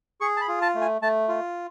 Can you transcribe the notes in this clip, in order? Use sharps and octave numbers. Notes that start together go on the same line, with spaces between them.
G#4 C#6
A5
B5
F4
A5
A3
G#5
A3 A5
F4